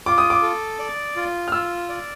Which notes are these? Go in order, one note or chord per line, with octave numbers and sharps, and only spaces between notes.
F4 D6
D#6
D6
A4
D5
F4
F6
F4 E6
D5